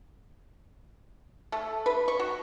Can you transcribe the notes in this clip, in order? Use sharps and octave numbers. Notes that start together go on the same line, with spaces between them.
A3
B4
C#6
F#4